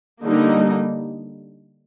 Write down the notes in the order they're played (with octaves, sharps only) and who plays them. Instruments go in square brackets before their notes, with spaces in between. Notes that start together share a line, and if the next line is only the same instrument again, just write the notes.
[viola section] D3 G3 A#3 D#4